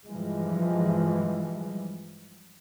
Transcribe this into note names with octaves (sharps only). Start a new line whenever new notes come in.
G2 E3 F3 G3 G#3